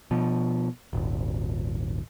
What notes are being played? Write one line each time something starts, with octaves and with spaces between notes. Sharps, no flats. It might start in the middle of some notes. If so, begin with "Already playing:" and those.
B2 F3
D#1 G#1